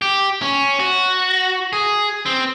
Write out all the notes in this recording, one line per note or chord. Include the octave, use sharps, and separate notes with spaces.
G4
C#4
F#4
G#4
C4